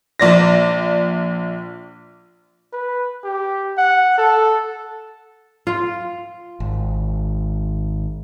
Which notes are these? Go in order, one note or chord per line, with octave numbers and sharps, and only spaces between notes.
A#1 D5 A#6
B4
G4
F#5
A4
F4
G#1